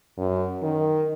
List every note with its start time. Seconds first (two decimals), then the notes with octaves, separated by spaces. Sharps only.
0.18 F#2
0.62 D#3